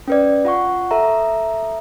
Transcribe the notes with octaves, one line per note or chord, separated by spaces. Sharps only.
C#4 B4 D5
F4 F#5 C#6
A4 E5 A#5